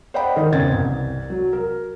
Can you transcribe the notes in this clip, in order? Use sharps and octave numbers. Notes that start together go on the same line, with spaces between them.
C5 D5 D#5 F#5 G5 B5
D#3 D#4 A#4
E2 C#3 C4 G#6 A6
C2
F#3
A#4